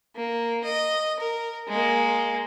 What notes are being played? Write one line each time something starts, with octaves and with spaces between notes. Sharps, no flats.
A#3
D#5
A#4
G#3 A#3